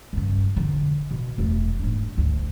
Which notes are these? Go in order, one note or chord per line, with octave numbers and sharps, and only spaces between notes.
G2 C#3
E1 D3
B2
E1 A3
G#2 D4
D2